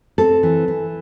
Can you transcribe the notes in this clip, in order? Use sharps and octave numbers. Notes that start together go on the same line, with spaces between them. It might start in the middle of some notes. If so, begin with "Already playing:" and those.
C4 A4
E3
E3